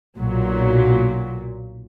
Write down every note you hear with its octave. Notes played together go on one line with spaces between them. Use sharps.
B1 A#2 F#3